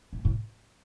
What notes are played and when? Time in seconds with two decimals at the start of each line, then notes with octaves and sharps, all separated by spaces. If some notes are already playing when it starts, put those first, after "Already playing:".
0.13 A2
0.25 A2